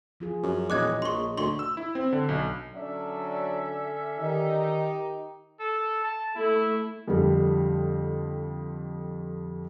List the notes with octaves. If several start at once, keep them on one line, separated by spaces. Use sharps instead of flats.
F3 F4 G#4
F#2
E1 A#2 C#5 D#5 D6 F#6 G#6
A#1 C6 C#6
D2 C6 C#6
E6
E4
C4
D3
B1
D3 F#3 C#4 D4 E5
D#3 D#4 G4
A4
A5
A3 E4
F2 D3 G3